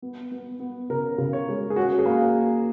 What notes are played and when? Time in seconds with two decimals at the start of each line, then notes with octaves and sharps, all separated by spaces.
0.02 B3
0.31 B3
0.60 B3
0.90 C#3 A#4
1.18 C#3
1.33 C#5
1.48 G#3
1.70 G#4
1.76 C#4 F#4
1.99 G#4
2.06 A#3